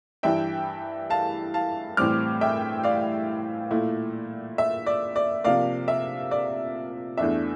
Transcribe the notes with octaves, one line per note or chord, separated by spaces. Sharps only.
G2 E3 G3 E5 G5
F5 A5
F5 A5
A2 E3 G3 C4 D6 F6
E5 G5
D5 F5
A#2 A3 E4
E5
D5
D5
C3 F3 A#3 D5 F5
E5
D5
E2 E3 A3 D4 E5